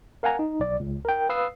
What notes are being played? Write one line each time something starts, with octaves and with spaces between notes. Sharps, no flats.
A#4 F5 F#5 G#5 A#5
D#4
B1 D5
C#2
A#4 G5
B4 F5 D#6 E6 C7